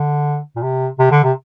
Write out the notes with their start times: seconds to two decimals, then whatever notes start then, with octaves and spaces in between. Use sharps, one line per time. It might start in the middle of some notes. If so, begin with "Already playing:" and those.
Already playing: D3
0.56 A#2
0.62 C3
0.99 C3
1.11 D3
1.23 C3